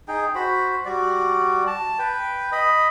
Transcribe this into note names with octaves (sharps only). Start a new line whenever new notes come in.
D#4 G#4 G5
F#4 C5 B5
G3 F#4 D5
A5
B4 G5
D#5 B5